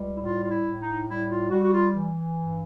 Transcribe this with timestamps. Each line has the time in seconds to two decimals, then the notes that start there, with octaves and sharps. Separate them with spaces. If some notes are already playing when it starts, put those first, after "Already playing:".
Already playing: C#2 G3
0.16 E4
0.21 A2 F4
0.44 F4
0.50 E4
0.64 A2
0.79 D#4
1.07 G3 E4
1.28 F4
1.50 G3 F#4
1.62 F#4
1.72 F4
1.93 E3
2.36 G2